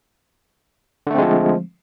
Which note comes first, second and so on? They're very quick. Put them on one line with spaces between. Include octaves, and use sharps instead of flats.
D3 A3 C4 G#3 F3